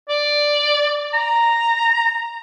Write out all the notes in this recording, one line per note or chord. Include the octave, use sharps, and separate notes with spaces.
D5
A#5